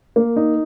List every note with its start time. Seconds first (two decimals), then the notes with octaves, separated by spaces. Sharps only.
0.16 A#3
0.36 D#4